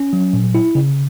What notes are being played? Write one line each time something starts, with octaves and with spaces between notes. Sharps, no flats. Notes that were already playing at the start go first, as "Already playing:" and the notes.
Already playing: C#4
F#3
A#2
E4
C#3